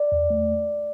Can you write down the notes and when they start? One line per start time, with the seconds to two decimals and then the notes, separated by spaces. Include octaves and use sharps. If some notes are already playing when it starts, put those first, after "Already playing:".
Already playing: D5
0.12 E2
0.30 A3